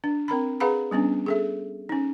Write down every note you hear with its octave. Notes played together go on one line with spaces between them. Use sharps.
D4
C4 A#4 A#5 B5
G#4 B4 F5 F#5 A#5 B5
G3 B3 C#4 D4
G#4 A4 E5
C#4 D#4